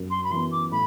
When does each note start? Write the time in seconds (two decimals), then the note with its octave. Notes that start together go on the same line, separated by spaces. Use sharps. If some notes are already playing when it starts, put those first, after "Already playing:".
Already playing: F#2
0.10 C6
0.24 B5
0.31 E3 B3 C6
0.51 D6
0.71 A2 B5